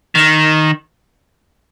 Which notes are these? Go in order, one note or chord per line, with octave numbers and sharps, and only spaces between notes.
D#3